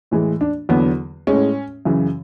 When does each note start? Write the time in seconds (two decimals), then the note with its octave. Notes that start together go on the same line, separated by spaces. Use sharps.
0.11 A2 E3 G#3
0.41 D4
0.69 E2 D3 F#3 B3
1.27 A2 G#3 C#4
1.85 F#2 C#3 E3